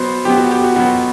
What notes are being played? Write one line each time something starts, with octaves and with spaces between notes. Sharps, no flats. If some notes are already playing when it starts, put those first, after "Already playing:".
Already playing: B2 F#3 B3 C5
B2 F#3 B3 G4
F#4
G4
F#4
B2 F#3 B3 F#4